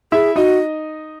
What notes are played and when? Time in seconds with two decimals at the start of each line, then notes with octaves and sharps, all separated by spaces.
0.12 E4 G#4 E5
0.36 D#4 F#4 D#5